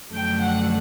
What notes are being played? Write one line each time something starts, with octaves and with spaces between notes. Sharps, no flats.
F#2 D3 F3 A3 G5
F#5